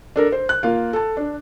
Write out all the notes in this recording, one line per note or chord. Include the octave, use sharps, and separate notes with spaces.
D4 A4 A#4
C5
F#6
A#3 F4 F5
A4 A5
D4